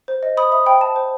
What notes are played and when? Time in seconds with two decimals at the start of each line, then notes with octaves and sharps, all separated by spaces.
0.08 C5
0.23 D#5
0.37 C5 B5 D#6
0.52 E5 B5 D#6
0.66 C5 G5 B5
0.81 G5 A5
0.96 C5